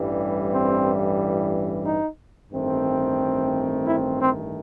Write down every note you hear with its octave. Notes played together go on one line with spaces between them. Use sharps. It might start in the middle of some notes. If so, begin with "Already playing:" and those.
Already playing: A1 G2 E3 G3
C4
D#4
A1 G2 D#3 A3 C4
E4
C4